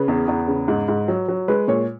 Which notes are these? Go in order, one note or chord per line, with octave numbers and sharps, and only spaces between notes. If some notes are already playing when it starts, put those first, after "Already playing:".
Already playing: C#3 B4
E2
E2
C#3
G#2
G#2
F#3
F#3
G#3 B4
A#2 C#5